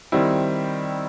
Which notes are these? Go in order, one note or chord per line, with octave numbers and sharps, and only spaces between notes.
D#3 G3 C4 E4